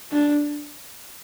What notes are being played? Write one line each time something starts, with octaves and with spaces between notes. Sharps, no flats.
D4